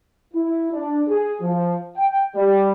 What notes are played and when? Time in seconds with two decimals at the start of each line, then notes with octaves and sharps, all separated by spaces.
0.34 E4
0.73 D4
1.08 G#4
1.41 F3
1.95 G5
2.35 G3